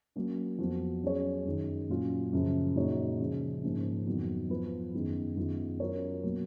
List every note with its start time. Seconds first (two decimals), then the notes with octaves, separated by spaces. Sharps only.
0.16 F#3 A#3 C#4
0.58 F2 F3 B3 F#4
1.03 F#3 C#4 G#4 C#5
1.45 F#2 D#3 G#3
1.89 A#2 F#3 C#4 F4
2.32 F#2 C#3 F3
2.76 A#2 G#3 D#4 F#4 C#5
3.19 C#3 F3 G#3 C#4
3.63 G#2 F3 A#3 C#4
4.07 F2 D#3 F#3 B3
4.49 F3 B3 F4 B4
4.94 F#2 D#3 G#3 B3
5.36 F#2 D#3 G#3 B3 F4
5.80 F#3 C#4 F4 A#4 C#5
6.23 B2 F#3 A#3